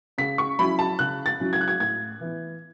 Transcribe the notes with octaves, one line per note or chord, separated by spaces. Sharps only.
C#3 B6
C#6
F#3 C#4 E4 B5
A5
C#3 F#6
A6
F#3 C#4 E4
G#6
F#6
G#6
A2 G#6
E3 B3 E4